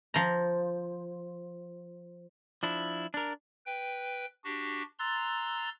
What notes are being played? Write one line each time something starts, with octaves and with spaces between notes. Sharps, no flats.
F3 A#5
F3 D4 E4
D4 A#4
B4 G5
D4 F#4 G4
A#5 C6 E6 F#6 A6